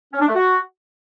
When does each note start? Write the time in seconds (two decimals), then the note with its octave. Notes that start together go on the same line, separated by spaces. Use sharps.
0.13 C#4
0.20 D4
0.28 A3
0.35 F#4